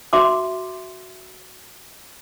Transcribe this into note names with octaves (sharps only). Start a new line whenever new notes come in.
F#4 E5 C6 D6